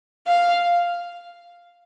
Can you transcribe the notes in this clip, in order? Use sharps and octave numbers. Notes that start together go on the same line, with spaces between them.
F5